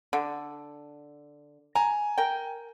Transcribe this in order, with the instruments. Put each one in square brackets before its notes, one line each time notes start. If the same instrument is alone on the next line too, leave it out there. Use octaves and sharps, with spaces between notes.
[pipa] D3
[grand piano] G#5 [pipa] A#5
[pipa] A#4 G5